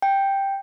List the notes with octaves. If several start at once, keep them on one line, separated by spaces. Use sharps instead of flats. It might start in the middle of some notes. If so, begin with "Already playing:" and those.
G5